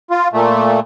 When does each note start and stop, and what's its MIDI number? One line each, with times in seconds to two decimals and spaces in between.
0.11 0.28 65
0.33 0.80 46
0.33 0.80 57